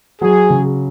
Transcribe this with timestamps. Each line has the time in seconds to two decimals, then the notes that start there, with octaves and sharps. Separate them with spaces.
0.21 F#3 G#4
0.50 C#3